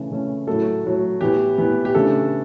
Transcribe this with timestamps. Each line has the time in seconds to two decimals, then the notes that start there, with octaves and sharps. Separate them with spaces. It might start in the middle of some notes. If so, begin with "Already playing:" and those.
Already playing: C#3 E3 A3 C#4
0.11 C#3 E3 A3 C#4
0.47 A2 F#3 A3 A4
0.84 A2 F#3 A3
1.21 A2 E3 B3 G4
1.58 A2 E3 B3
1.85 G4
1.95 C#3 E3 A3 D4 A4